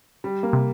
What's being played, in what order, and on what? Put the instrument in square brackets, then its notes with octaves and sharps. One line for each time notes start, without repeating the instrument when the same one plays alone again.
[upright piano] G3
A#3
[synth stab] C3